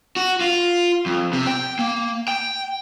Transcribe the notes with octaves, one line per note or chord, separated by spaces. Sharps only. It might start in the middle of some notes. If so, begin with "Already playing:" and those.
F#4
F4
F2
C3
G5
A#3
G5